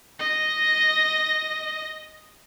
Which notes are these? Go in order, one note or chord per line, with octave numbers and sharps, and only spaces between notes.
D#5 A#6